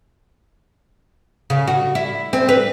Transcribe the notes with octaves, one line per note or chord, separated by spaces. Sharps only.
C#3
F#4
E4
C4
B4